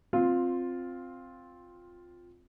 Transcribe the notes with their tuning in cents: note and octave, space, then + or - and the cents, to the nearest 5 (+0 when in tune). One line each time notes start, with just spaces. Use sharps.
C4 +0 F4 +10